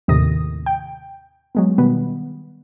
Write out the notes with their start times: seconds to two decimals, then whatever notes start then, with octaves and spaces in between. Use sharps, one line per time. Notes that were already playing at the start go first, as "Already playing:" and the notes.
0.08 D#2 A2 C3 D#3 D#6 A#6
0.66 G5
1.55 F#3 G#3 B3
1.78 B2 D#3 G3 B3